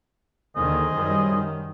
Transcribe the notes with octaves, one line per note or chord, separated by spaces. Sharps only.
D#2 D3 D#3 G#4 C5 D#5
F#2 D#3 G3
D#3